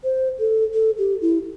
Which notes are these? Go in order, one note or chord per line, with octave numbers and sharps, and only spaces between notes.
C5
A4
A4
G4
E4